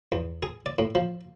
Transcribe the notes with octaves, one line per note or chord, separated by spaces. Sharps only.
E2
G#4
D5
A2
F3